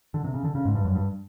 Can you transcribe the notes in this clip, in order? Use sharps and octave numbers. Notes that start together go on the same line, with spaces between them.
D3
C3
C#3
D3
C#3
G#2
G2
F#2
G2